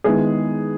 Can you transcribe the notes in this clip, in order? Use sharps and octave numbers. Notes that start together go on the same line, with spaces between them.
D#3 G#3 B3 E4 G#4